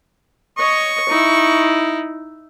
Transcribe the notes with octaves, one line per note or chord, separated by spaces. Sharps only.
C#5 D#5 C#6
D#4 E4